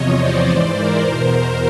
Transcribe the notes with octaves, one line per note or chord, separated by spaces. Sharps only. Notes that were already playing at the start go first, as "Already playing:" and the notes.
Already playing: E2 C3 F3 C#5 D#5
C5 D5
G#2 E3
A#4 C5
E2 B2